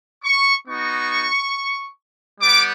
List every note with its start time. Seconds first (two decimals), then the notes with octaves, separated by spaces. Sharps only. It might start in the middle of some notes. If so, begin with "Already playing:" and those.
0.24 C#6
0.67 B3 D#4 F#4 C#6
2.40 G3 B3 D6